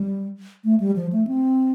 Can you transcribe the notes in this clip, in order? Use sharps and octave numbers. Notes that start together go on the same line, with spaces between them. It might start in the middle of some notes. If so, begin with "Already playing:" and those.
Already playing: G3
A3
G3
F3
A3
C4